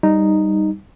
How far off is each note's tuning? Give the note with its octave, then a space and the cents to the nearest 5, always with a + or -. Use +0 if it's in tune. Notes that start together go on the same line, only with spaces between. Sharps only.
G3 +0 D#4 -5